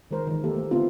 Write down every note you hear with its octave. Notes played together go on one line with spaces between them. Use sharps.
D#3 G#3 A#4 C5
D#3 E3
A#3 G4 A4
A3
D3 A3 B3 C4 E4 F4